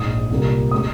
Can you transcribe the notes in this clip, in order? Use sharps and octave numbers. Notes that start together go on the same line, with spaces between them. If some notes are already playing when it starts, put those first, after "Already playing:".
Already playing: A#1 G#2 G#3 D#6
C2 A#2 A#3
G#3 D#6